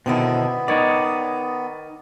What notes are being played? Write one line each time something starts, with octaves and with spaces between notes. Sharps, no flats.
B2 D3 D#3 B3 C4 D#4 E4
D#3 D#4 C#5 D5